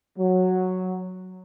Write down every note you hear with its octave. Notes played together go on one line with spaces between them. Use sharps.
F#3